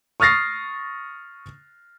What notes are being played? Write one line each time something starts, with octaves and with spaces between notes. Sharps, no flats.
C#6 D#6 F6 A6 A#6 C7